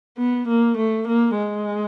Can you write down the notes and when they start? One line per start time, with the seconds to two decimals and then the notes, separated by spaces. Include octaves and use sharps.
0.18 B3
0.48 A#3
0.77 A3
1.08 A#3
1.37 G#3